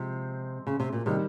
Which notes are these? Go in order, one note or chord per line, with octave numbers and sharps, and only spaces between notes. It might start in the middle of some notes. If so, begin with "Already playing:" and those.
Already playing: C3 F3 G#3 C4
C#3
C3
A#2
C3 D#3 G3